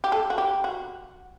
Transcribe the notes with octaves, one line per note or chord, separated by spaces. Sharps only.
G4
A4
F#4
G4
F#4